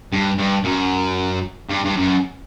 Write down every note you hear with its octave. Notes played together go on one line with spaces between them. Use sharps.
G2
G2
F#2
G2
G2
F#2